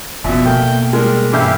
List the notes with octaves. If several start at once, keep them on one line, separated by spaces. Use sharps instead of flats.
F1 A#1 B2 E5
B2 A3 A#3 A#4 G5
G3 G#3 A#4
G2 E3 E4 G4 A4 F5 G6